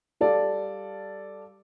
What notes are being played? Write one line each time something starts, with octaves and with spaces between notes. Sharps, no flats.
G3 A4 D5 F5